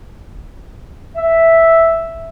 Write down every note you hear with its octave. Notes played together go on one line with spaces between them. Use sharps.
E5